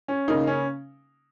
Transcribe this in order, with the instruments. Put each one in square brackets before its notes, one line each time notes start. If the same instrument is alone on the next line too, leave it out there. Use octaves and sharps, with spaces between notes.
[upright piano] C#4
C#3 A#3 D#4
C#4